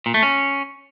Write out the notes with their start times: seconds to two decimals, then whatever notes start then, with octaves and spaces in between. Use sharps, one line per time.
0.06 A#2
0.14 A3
0.23 C#4